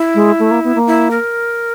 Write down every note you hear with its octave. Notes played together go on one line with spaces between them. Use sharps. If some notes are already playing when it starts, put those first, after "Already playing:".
Already playing: E4
G#3
A3
A#3
B3
A#3
E4
A#4